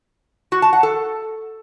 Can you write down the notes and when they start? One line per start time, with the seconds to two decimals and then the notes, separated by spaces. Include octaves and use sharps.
0.52 F#4
0.62 A5
0.73 F#5
0.83 A4